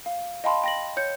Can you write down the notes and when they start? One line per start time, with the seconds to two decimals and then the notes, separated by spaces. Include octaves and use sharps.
0.06 F5
0.44 D#5 F5 G5 A5 B5 C6
0.64 G5 A#6 F#7
0.97 C#5 G6 C#7